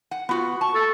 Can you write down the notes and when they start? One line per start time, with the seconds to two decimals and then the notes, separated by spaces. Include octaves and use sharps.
0.11 F#5
0.29 B3 F4 F#4
0.61 A5 C#6
0.75 A4